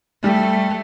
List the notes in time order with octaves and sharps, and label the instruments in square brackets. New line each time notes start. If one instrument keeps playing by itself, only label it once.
[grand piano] G3 [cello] A3